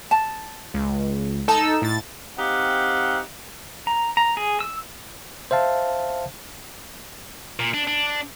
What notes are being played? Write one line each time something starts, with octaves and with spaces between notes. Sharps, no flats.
A5
C#2
D#4 A4 A5 E6
A2 A6
C4 D#4 G4 F5 F#5
A#5
A#5
G#4
E6
C5 E5 F5 A5
A#2
D4
D4